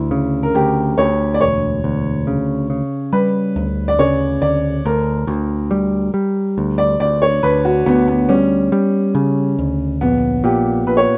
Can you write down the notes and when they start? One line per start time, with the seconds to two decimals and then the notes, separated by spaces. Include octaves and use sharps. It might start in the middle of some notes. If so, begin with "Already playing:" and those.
Already playing: D2 E4
0.11 C#3
0.43 A#4
0.55 D2 G4
0.98 D2 C#5
1.34 D5
1.41 E1 C#5
1.84 D2
2.27 C#3
2.70 C#3
3.13 G3 B4
3.56 D2
3.88 D5
3.99 C#3 C#5
4.42 D2 D5
4.85 D2 A#4
5.27 D2
5.71 G3
6.14 G3
6.58 D2
6.78 D5
7.00 D2 D5
7.22 C#5
7.43 D2 B4
7.65 F#4
7.86 D2 B3
8.08 B3
8.29 G3 C#4
8.72 G3
9.15 C#3
9.59 D2
10.01 A#1 B3
10.44 A#2 G4
10.87 A#2 B4
10.97 C#5